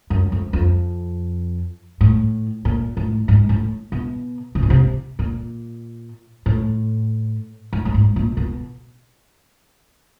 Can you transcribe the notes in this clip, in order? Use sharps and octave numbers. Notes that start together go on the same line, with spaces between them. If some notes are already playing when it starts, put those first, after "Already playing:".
F#2
F2
F2
A2
A#2
A2
G#2
A2
B2
C3
B2
C3
A#2
A2
G#2
A2
G#2
A#2
B2